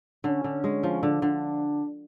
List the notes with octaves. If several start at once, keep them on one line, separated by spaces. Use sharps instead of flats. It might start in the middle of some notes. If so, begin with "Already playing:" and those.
D3 C#4
D3
G#3
F3
D3 D4
D3